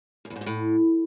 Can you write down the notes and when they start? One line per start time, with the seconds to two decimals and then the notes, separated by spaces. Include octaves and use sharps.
0.25 F#2
0.30 E2
0.36 G#2
0.41 A#2
0.46 A2